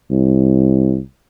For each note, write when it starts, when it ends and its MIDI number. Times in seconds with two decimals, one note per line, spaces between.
0.11 0.99 36